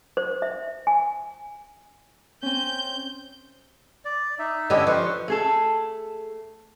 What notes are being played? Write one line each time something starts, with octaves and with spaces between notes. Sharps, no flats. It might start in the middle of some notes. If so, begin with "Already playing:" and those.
C5
E5
G#5
C4 C#4 G6
D5
D#4 E5
D3 C#4 E4 G4 A4 B4 D#5
F3 B4 C#6
A3 G#4 A4